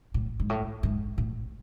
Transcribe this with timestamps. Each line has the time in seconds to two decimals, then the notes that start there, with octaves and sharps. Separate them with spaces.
0.14 A2
0.40 G#2
0.50 A2
0.83 G#2
1.18 A2